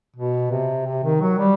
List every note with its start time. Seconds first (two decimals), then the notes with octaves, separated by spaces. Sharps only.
0.16 B2
0.51 C3
0.86 C3
1.04 D#3
1.21 F#3
1.39 G3